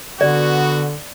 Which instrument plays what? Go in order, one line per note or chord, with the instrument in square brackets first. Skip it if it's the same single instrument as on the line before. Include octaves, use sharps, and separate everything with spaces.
[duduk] D3 [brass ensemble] B3 F#4 [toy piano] D5